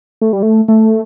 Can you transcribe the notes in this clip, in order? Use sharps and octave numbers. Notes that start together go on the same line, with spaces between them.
A3
G3
A3
A3